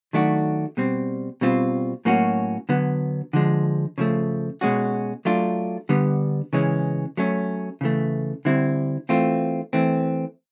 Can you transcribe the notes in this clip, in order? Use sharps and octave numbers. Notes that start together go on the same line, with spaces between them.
D#3 F#3 A3 D4 F#4
B2 G3 C4
B2 G3 C4 F4
A2 F#3 A#3 C#4 F#4
D3 F#3 B3
D3 F3 G#3
C#3 F3 A3
B2 G#3 C#4 F#4
F#3 A3 D4 F4
D3 G3 B3
C#3 E3 G#3 C#4
F#3 A3 C#4
C#3 E3 A3
D3 G3 C4 E4
E3 A3 C4 F4
E3 A3 C4